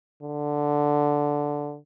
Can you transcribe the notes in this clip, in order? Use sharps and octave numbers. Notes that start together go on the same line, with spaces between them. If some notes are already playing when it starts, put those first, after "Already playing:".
D3